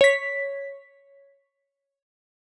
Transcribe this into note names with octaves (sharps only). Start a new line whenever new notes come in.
C#5 B6